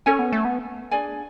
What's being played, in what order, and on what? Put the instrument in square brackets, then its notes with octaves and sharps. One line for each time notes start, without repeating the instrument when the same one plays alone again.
[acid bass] C#4 [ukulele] A4 C#5 G#5
[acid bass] B3
A3
B3
[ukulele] D4 G#4 D5 G#5